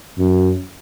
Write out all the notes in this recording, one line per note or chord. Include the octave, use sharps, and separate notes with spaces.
F#2